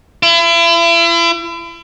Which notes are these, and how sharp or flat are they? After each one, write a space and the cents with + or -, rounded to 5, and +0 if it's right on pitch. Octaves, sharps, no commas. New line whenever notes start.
E4 +40